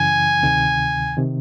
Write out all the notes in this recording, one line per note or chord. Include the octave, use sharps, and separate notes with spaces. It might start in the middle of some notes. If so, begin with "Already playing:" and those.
Already playing: F#2 C#3 E3 G#5
D2 C3 D#3
C3 D#3